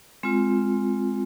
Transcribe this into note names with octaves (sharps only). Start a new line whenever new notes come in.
G#3 C4 F4